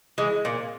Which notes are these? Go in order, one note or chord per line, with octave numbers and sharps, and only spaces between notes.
E3 G#3
A#2